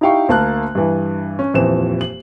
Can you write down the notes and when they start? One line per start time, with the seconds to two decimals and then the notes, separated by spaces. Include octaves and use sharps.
0.01 D#4 E4 G4 F5 G5 C#6
0.29 D2 A#3 A5 F#6
0.75 G2 E3
1.39 C#4
1.54 D#1 F2 E3 C4 E7
2.01 F#7